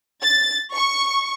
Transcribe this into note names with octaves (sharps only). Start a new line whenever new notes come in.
A6
C#6